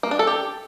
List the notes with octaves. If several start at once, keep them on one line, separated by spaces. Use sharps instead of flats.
A#3
D4
A4
G4